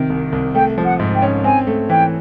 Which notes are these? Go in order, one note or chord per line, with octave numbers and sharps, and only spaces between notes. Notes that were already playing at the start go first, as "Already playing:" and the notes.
Already playing: C3 D#3
C2
C2
A3 G5
F3
F#5
G#2
G5
C#4
C4 G#5
A3
E3 G5